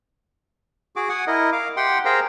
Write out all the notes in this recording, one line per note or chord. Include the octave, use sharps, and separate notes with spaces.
F#4 G#4 D6
F#5 G#5 D#6
E4 A#4 D#5
F5 D6
G4 F#5 G5 C6
G#4 A#4 C5 F5 G5 A#5